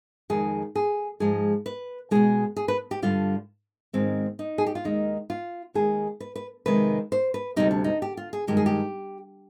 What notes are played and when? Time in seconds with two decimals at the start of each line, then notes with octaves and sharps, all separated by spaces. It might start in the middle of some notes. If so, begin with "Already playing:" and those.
0.30 F2 D#3 G#3 G#4
0.75 G#4
1.20 G#2 F3 G#3 G#4
1.66 B4
2.11 B2 G#3 G#4
2.56 G#4
2.68 B4
2.91 G4
3.02 G2 D3 G3 F4
3.93 G#2 D#3 G#3 C4
4.39 D#4
4.58 G#4
4.67 G4
4.75 F4
4.84 D#2 D#3 G#3 D#4
5.30 F4
5.74 D#2 D#3 G#3 G#4
6.20 B4
6.36 B4
6.66 F2 C3 D#3 G#3 B4
7.12 C5
7.34 B4
7.56 D2 C3 G3 D#4
7.71 D4
7.84 D#4
8.02 G4
8.17 F4
8.33 G#4
8.47 G2 D#3 G#3 G4
8.57 G#4
8.66 G4